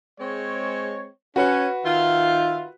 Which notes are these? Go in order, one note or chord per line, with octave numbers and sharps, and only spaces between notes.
G#3 C4 C#5
C#4 F#4 B4
D#3 F4 E5